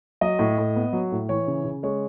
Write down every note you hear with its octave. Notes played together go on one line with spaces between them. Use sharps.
F#3 D#5
A2
A2
B3
F#3
A2
E3 C#5
C#3
C#3
G#3 C#5